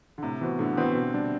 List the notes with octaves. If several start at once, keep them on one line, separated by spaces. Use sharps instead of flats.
D3
A2 C3
E3 B3 F#4 C5
A2 D3
E3 B3 C4 F#4 C5
B2
G3 D4